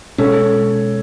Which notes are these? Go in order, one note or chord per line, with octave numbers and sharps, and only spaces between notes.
B2 G#3 C#4 A4 C#5